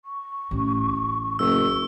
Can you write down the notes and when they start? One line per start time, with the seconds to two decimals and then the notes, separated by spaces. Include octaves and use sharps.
0.05 C#6
0.51 A1 C#4
1.39 F#1 E6